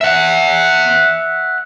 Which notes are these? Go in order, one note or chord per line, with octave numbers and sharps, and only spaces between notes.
E5 F#5